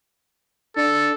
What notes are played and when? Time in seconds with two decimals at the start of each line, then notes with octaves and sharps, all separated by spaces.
0.76 D4 A4